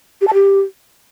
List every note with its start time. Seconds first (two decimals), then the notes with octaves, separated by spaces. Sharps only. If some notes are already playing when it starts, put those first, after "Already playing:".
0.21 G4
0.27 A5
0.34 G4